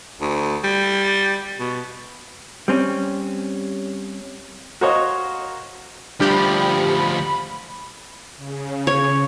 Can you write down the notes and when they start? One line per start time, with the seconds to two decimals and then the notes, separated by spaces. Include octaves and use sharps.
0.21 D2
0.64 G3
1.59 B2
2.68 G3 C4 C#4
4.81 F#4 A#4 C5 C#5 D#5 F5
6.20 D2 F3 G3 D4 G4 B5
8.37 C#3
8.87 C#5